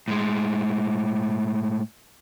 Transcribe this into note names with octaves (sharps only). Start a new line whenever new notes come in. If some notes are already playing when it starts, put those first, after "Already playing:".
A2 G#3